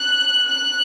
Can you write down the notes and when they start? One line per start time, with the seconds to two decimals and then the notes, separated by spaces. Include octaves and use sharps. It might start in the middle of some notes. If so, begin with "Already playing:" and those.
Already playing: F#6
0.48 F#6